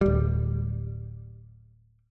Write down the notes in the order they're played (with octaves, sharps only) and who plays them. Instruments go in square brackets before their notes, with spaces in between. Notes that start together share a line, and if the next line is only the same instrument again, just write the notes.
[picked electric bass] D1 G3